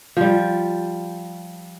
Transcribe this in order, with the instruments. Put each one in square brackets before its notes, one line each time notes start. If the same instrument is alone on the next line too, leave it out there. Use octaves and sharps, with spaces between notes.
[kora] F3 G3